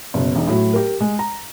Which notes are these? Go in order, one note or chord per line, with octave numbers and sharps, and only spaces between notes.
F#1 B2
E1 D#4
A2 F#3
G4 A#4
G#3
A#5